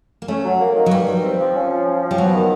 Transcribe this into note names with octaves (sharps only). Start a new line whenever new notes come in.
A#3
A3 C#4
F#3
A#3
D#3
F#3
G2 G3
D#3
C4
F3
C#4
F3
C#4
F3
G3
F#3 B3
D#3